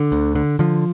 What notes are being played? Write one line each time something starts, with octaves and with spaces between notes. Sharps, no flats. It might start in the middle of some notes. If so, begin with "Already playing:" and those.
Already playing: D3
D2
D3
D3 F3